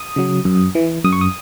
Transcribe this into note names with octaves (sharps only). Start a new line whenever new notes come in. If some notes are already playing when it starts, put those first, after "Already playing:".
Already playing: D#6
C#3 F#3
F#2
E3
F#2 D#6
C#6
D#6